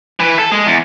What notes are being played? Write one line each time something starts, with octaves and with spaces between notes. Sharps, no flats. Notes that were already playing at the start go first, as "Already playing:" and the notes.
E3 B4
A4
G#3
E2